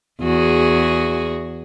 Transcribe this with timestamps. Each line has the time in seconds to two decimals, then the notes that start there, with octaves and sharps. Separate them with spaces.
0.22 E2 F#4 G#4